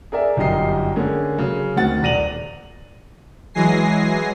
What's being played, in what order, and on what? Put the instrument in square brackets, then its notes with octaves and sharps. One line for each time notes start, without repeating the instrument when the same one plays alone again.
[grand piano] G#4 A#4 D5 E5
G1 F#2 D#4 G4 D#5 C7
D3 A#3 C#4 G#4
C#3 F#3
D2 D#3 C4 F#4 F#5 A6
D#1 D5 A#6 D#7 F7 F#7
[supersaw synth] E3 F#3 G#3 G#5 A#6 C7